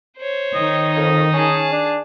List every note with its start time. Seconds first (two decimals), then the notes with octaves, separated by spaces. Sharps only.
0.17 C5 C#5
0.55 D#3 D#4 D#5
0.96 F2
1.33 C#4 G#4 A5
1.73 D4